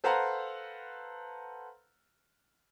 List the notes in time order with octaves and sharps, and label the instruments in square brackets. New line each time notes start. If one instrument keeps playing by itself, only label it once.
[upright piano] A4 B4 C5 F5 F#5 A#5